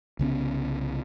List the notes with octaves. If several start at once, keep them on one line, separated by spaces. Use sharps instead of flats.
C2 C#3 B3 C#4